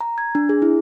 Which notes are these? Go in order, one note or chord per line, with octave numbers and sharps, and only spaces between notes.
A#5
G#6
D4
G#4
E4